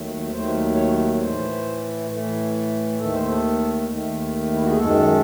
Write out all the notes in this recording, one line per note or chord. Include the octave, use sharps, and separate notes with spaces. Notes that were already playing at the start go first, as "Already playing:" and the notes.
Already playing: D#2 D#3 F#3 A3
D#2 D#3 F#3 A3 C5
C#5
A2 E3 A3 C5
A2 E3 A3
D#2 D#3 A3 A4
C5
A4
D#2 D#3 A3
E4
F#4
G#4
F#2 D#3 G#3 A4